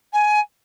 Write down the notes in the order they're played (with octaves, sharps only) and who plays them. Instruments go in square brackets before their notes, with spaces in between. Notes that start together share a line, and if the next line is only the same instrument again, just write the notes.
[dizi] G#5